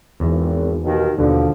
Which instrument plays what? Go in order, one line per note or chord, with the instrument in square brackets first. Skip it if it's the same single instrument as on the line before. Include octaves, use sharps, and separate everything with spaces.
[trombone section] G#1 [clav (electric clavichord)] E2
[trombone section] D#2 B2 D#3
[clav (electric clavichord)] D#2 B2 [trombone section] D3 F3